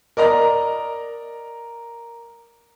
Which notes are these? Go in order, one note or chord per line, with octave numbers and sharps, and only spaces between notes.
A#4 D5 D#5 A#5